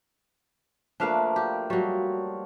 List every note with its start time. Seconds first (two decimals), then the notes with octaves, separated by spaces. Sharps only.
1.00 F3 A3 A#3 D4 B4 F5
1.36 G4
1.70 F#3 G3 C#5